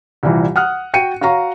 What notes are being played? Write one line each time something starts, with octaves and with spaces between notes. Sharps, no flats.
C2 A#2 E3 G3
F#5 D#6 F6 F#6
F#4 G5 C#7 D#7
F#4 C#5 F5 A#5 C#6